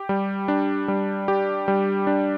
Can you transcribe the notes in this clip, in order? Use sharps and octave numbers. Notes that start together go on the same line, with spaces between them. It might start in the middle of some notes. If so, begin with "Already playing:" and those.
Already playing: G4
G3
D4
G3
G4
G3
D4